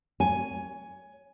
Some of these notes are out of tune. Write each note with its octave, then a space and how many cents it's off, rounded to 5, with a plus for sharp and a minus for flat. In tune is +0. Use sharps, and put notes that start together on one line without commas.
C#5 +15 G#5 +0